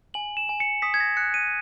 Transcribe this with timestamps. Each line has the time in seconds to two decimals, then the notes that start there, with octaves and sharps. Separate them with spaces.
0.14 G#5 F#7
0.37 E7
0.49 G#5
0.60 C#7
0.82 D#6 B6
0.94 G#6
1.00 A#6
1.17 F#6 C#7
1.34 D#7